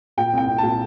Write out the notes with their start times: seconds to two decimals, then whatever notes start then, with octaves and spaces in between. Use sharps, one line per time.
0.17 A#2 G5
0.33 C2 G5
0.47 C2
0.58 A#2 A5